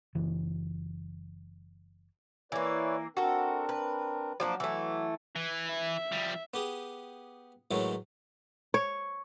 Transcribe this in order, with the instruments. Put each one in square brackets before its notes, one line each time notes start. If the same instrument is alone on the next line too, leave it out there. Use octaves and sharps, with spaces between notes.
[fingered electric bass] F#1 E3
[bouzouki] E3 A#3 [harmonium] B4 C#5 D5
[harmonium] C4 D4 A#4 [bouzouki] F#4 A4
[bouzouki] B4
[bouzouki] F3 A#3 D4 [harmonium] F#3
[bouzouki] E3 A3
[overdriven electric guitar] E3
[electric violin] E5
[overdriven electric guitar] F3 G3
[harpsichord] B3 G4 G#4
A2 D#3 E3 F#3 G#3
[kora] C#5